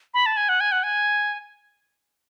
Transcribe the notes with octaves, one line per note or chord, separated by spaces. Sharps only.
B5
A5
G#5
F#5
G#5
F#5
G#5